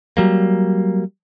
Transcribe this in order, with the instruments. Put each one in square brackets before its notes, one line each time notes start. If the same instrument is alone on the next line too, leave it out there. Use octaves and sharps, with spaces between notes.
[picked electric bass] F#3 G3 A#3